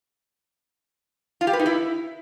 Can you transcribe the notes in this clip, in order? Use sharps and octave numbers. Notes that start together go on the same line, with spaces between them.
F4
G4
B4
D#4
E4